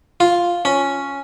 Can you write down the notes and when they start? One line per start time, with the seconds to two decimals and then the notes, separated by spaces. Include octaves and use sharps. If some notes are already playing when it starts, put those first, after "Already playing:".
0.20 F4
0.65 C#4